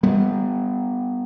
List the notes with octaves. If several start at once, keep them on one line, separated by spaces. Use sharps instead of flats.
G3 B3